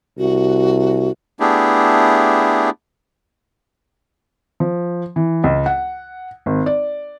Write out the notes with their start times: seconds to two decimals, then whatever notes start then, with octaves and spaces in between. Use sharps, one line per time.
0.18 C2 F#4
1.40 A3 B3 D4 E4 G4 G#4
4.60 F3
5.16 E3
5.44 C#2
5.66 F#5
6.46 G#1
6.66 D5